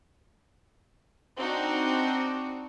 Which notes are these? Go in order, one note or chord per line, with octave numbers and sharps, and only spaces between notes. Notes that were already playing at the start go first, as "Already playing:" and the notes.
C4 D4 D#4 F#4